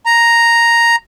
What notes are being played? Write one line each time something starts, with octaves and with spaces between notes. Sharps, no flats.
A#5